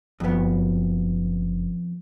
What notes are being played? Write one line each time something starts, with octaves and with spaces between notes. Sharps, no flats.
F#1 F2 B3